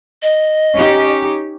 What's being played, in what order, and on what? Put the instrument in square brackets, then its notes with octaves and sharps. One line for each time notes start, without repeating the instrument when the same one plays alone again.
[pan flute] D#5
[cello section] C#4 D#4 G4